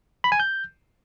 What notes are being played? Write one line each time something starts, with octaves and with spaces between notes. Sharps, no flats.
B5
G#5
G6